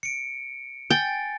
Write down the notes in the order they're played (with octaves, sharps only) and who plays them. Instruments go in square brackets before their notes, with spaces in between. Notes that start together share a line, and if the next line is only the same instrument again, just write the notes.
[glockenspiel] C#7 D7
[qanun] G5 [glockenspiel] G#5 A6